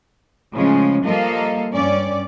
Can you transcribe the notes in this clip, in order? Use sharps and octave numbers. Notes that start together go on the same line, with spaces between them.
A2 C#3 F3 G#3 C#4
F3 G3 A#3 A4 D#5 F5
G2 C#4 D5